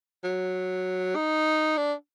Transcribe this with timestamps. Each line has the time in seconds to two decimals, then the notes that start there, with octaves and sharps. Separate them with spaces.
0.24 F#3
1.16 D#4
1.77 D4